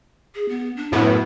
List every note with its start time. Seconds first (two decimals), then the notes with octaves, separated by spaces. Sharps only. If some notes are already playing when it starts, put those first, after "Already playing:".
0.35 G#4
0.49 B3
0.77 D4
0.92 F#2 A2 B3 E4